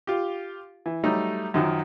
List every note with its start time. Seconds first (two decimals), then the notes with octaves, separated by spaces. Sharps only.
0.07 F4 G4
0.86 E3
1.04 F#3 G3 A3 D#4
1.54 F#2 D#3 F3 F#3